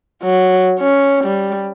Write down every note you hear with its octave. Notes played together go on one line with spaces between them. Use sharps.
F#3
C#4
G3